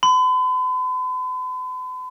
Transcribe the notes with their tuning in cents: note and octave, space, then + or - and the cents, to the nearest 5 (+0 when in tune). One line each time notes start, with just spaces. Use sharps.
B5 +45